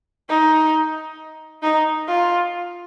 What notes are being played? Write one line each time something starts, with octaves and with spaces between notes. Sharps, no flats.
D#4
D#4
F4